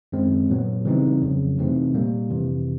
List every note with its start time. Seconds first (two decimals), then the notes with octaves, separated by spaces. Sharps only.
0.12 F#2 D#3 G#3 C4
0.49 A#2 F#3 B3
0.85 C#3 E3 G3 C4 D#4
1.22 F2 C#3 F#3
1.58 C3 E3 A3 C4 D#4
1.94 A#2 G3 A#3
2.30 F2 C3 E3